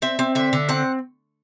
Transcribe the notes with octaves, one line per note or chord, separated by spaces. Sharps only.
C4 E5
C4
D3 E5
D3
C4 F#5